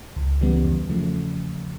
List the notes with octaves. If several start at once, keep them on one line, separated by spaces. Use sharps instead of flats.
C#2
C#3 E3 G3 B3
E2
C#3 F3 A3